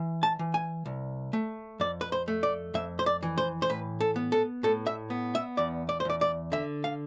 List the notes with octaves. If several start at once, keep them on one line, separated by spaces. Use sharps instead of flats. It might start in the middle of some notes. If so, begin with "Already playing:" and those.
Already playing: E3
A5
E3
G#5
C2
A3
F2 D5
B4
C5
A3
D5
F2 E5
C5
D5
E3
C5
C5
A2 B4
A4
B3
A4
A2 A4
E5
B3
E5
E2 D5
D5
C5
E2 D5
D5
D3 E5
F5